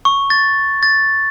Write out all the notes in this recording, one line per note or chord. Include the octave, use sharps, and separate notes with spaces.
C#6
A6
A6